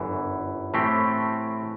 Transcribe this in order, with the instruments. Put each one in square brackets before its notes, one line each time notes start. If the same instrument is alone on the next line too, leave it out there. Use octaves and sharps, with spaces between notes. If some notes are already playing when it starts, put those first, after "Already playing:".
Already playing: [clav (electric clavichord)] G1 F#2 E3
A2 E3 A3 C4 G4